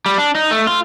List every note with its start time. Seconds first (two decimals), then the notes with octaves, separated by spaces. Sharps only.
0.06 G3
0.18 D4
0.35 D#4
0.51 A3
0.67 F4